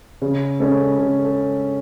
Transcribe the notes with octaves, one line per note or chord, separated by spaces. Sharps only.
C#3
G#3 C#4 A4
C#3 A4
A4